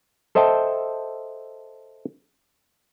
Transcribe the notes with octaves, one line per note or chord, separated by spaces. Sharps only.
A4 C5 D#5 E5 G5 A5